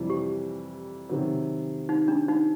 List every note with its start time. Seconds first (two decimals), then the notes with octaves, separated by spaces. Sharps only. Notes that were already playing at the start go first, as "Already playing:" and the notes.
Already playing: F2 C3 E3 G3
0.10 G4
1.09 C3 D#3 F#3
1.89 D#4
2.08 D4
2.28 D#4